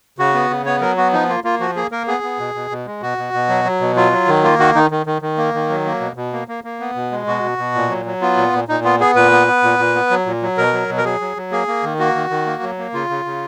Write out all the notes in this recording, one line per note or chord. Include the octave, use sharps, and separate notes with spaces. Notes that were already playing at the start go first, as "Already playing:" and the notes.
C#3 F#4
B3
C#3
B3 C#5
F#3 A#4
B3 F#4
F3 D#4
A#3 F4
A#3 F4
F3 F#4
A#3 G#4
A#3 A#4
B3 G#4
B3
B2
B2
B2
G#3
B2 F#4
B2
B2
F#3
F#3
B2
F#3 F4
F#3
D#3
A#3 F4
D#3 F#4
D#3 D#4
D#3
D#3
D#3
A#3
D#3
F#3
A#3
B2
B2
A#3
A#3
A#3
B3
B2
G#3
B2 F#4
B2
B2
A#2
F#3
F#3
B3 F4
A#2
A#2
A#2 D#4
B3 F4
B3 G#4
A#2 B4
B3
B3
A#2
A#2
B3
F#3
A#2
F#3
B2 A#4
F#3
B2
A#4
F#3 G#4
F#3
F#3
A#3 G#4
A#3
D#3
A#3 F#4
D#3
D#3
A#3
F#3
A#3
C#3 F4
C#3
C#3